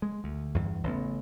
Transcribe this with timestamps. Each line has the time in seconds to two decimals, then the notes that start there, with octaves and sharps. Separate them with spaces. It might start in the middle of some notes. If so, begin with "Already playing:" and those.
0.02 G#3
0.24 D2
0.54 E2 G2
0.84 A1 C#3 A3 B3